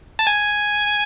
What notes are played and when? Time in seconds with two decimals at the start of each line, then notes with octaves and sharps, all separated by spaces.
0.19 A5
0.27 G#5